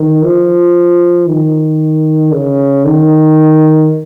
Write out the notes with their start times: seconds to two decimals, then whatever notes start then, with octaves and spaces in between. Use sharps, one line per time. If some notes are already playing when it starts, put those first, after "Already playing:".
Already playing: D#3
0.23 F3
1.28 D#3
2.32 C#3
2.85 D#3